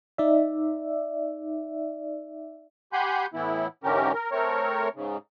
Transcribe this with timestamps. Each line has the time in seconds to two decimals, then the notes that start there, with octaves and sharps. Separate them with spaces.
0.18 D#4 D5 E5
2.93 G4 F#5 G#5 B5 C6 G6
3.34 A2 E3 B3 E4
3.84 G#2 D3 E3 C#4 G4 A#4
4.13 A#4
4.32 A3 C4 A#4 C#5
4.95 G#2 C#3